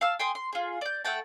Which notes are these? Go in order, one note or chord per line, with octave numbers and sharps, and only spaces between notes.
F5 A5 E6 F6
G5 G#5 C6 D#6
C6
F4 G#4
D5 G6
A3 F#5 G5 A5